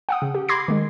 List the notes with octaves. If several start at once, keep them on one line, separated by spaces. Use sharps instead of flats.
F#5 G5 D#6
C#3
G4
B5 C6 D6 G#6 A#6 C7
D#3 G#3